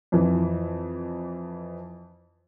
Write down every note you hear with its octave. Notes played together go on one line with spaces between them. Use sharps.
F2 E3